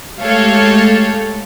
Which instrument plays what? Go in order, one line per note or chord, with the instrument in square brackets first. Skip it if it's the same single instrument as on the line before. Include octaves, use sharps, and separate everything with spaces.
[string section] G#3 A3 G4 A4 C#5 F5